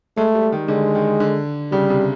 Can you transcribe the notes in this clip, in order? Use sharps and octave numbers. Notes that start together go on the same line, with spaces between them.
G#3 A3
G3
D#3
D3 G#3
D#3
D3
C#3 G3
C3